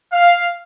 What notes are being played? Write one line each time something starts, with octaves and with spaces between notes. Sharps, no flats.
F5